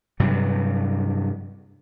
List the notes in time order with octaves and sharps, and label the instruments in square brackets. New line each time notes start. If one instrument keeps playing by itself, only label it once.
[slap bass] G2 C3 F#3